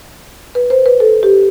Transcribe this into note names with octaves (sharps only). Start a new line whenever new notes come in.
B4
C5
B4
A4
G4